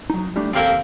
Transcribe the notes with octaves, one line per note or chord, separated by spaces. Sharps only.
F#3 D#4
G3 A3 D4
D#2 F3 A#3 C4 G4 A4 F5